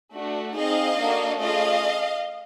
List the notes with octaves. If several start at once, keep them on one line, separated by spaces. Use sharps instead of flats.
A3 D4 F#4
C4 D#4 G#4 D#5 F5
A#3 D4 F#4 A4
A3 C#4 F4 G#4 D#5 F5